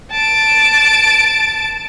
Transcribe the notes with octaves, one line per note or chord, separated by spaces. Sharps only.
A5 D7